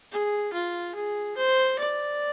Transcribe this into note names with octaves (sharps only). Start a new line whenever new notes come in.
G#4
F4
G#4
C5
D5